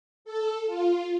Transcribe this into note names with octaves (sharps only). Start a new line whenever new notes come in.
A4
F4